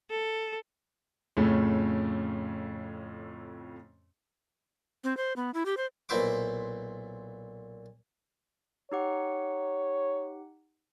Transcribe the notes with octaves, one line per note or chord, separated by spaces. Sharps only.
A4
F2 A2 C#3 A3 C#4
C4
C5
B3
E4
G4
C5
B1 A#2 E4 C5 E5 D6
D#4 G4 C#5 F#5